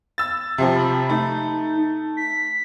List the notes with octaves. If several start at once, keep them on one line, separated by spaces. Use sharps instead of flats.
E6 A6
C3 F3 C4
B5
A3 D#4
B6